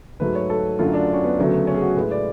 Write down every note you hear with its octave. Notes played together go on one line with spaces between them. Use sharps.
G#2 F#3 A3 B4
C#5
A4
F#2 D3 F#3 A3 F4
D4
C#4
B3
D2 C#3 F#3 A3
C#4
G#4
F#4
A2 G#3 B4
D5